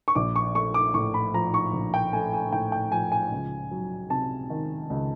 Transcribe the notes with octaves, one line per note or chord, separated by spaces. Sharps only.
C#6
A#1 D6
C#6
A3 C#6
D6
A2 C#6
B5
F3 A#5
C#6
A#1
G5
A3 G#5
G#5
A2 G5
G5
F3 G#5
G#5
C#2
F#3
C3 A5
D#3
C#2